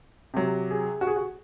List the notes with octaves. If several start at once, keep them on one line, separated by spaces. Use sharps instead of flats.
C3 F#3
G#4
F#4
G#4
F#4